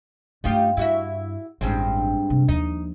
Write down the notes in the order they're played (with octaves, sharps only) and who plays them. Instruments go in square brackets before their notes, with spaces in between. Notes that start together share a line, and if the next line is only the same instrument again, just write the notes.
[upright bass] G2 A3 [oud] D#4 F4 G4
[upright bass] G2 [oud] E4 F#4 E5
[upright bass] A1 [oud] G2 G#3 C4
[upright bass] C3
[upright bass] D#2 F3 [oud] D#4